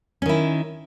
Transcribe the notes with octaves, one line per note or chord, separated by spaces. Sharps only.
D#3 C#4 E4